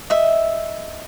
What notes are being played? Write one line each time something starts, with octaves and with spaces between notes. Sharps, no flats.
D#5 E5